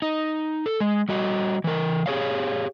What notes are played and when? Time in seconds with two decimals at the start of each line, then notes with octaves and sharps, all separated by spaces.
0.02 D#4
0.66 A4
0.80 G#3
1.09 G3 F#4 D#5
1.64 E3 A#4
2.06 G4 G#4 C#5 F5